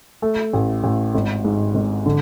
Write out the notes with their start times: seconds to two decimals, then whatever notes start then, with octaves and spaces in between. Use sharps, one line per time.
0.22 A3
0.53 A1
0.84 A1
1.15 G#1
1.44 G#2
1.75 G#1
2.06 D3